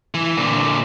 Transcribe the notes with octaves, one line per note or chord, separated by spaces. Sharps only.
E3
A#2 D3